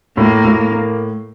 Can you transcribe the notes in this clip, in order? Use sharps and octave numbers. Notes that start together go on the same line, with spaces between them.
A2 A#3
A2
A#3